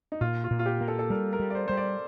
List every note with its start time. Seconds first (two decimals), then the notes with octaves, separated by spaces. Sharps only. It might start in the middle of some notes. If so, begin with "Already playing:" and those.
0.12 D#4
0.21 A#2 F4
0.44 F4
0.51 A#2
0.59 F4
0.66 G4
0.81 A#3
0.88 A4
0.99 A4
1.10 G3 A#4
1.33 A#4
1.40 G3
1.50 D5
1.55 C5
1.68 G3 C5
1.77 D5